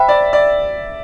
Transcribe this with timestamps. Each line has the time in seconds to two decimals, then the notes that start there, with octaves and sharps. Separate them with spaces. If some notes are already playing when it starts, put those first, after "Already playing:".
Already playing: C5 E5 G5 B5
0.09 D5
0.33 D5